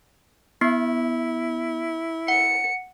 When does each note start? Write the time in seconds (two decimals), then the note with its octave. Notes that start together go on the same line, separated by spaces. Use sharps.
0.61 B3 E4
2.28 F#5 C#7